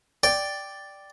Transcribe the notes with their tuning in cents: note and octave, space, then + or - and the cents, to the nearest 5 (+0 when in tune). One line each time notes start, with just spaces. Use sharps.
D5 +0 G5 +0